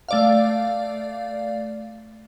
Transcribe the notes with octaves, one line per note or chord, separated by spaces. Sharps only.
A3 D5 F5